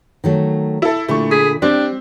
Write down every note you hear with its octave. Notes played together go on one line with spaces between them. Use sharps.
D#3 F#3 A3
E4 A4
A#2 D3 A3 E4 C#6
G#4 B6
G3 C4 D4